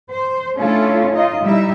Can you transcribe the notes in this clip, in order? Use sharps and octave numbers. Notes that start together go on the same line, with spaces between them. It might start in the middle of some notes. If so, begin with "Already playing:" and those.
C5
A3 C#4 D4 E4 F4 A4
D#4 F4 D#5
G3 D#4 E4 E5